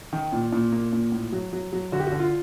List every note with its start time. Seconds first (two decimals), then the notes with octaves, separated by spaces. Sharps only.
0.13 D#3
0.32 A#2
0.52 A#2
0.72 A#3
0.93 A#2
1.12 A2
1.32 F#3
1.53 F#3
1.73 F#3
1.92 D3 F#4
2.00 G4
2.07 F#4
2.12 D3
2.19 F4